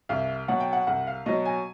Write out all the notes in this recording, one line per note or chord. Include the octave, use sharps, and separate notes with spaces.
C2 F5
B2 F#3 F#5
G5
F#5
C2 F#5
F5
B2 F#3 D#5
G#5